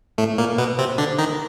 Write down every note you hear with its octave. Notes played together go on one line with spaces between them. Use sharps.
A2 A3
A#2 A#3
B2 B3
C3 C4
D3 D4
D#3 D#4